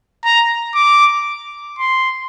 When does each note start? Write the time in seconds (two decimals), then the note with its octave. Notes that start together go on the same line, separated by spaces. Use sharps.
0.24 A#5
0.75 D6
1.79 C6